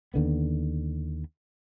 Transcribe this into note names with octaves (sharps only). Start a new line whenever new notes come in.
D#2 D3 B3